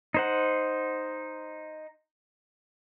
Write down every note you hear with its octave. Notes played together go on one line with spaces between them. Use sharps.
D#4 C5 F#5